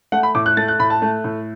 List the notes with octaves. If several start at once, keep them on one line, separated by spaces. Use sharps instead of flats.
A3 F#5
B5
A2 D6
F#6
A3 A6
F#6
A2 B5
A5
A3
A2